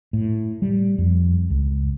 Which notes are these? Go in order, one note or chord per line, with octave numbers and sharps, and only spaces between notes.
A2
G3
F2
C#2